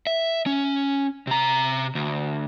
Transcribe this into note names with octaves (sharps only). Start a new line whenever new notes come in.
E5
C#4
C3 A#5
D2